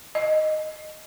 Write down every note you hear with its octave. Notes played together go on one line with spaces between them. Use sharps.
D#5